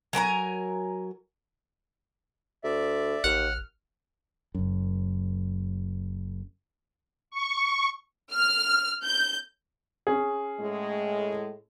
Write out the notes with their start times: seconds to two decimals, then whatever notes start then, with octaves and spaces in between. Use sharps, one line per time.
0.13 F#3 A#4 G#5 A#5
2.64 D2 D5 E5
3.24 A1 D#2 F#5 F6
4.55 F#1 F#2
7.31 C#6
8.31 F6
9.04 G6
10.07 C#4 G#4
10.60 A2 G#3